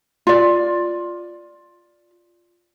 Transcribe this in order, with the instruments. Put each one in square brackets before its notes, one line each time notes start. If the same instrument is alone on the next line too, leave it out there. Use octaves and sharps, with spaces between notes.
[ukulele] F4 D5